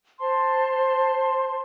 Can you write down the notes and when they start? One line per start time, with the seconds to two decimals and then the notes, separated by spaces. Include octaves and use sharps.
0.19 C5 A5 C6